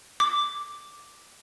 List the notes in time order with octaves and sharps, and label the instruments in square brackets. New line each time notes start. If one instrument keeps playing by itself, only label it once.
[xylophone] D6